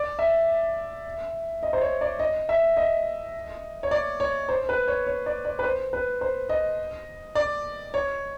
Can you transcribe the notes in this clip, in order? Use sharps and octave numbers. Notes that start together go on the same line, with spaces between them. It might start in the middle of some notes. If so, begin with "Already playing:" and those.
Already playing: D5
E5
D#5
C5
C#5
D5
D#5
E5
D#5
C#5
D5
C#5
C5
B4
C#5
C#5
D5
D5
B4
C5
B4
C5
D#5
D5
C#5